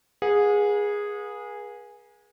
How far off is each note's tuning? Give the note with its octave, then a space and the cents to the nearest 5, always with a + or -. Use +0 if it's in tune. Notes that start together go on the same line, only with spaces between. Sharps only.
G#4 -10 B4 -45 F#5 -45